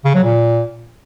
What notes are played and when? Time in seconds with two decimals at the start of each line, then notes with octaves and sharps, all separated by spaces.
0.05 C#3
0.14 F#3
0.23 A#2